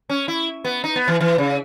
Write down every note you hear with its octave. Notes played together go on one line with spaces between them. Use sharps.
C#4
E4
B3
D#4
B3
E3
E3
C#3